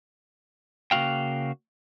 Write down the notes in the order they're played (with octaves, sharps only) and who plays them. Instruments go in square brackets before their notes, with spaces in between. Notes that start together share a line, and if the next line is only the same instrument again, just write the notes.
[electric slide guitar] C#3 A#3 C#4 F#4 F5 G5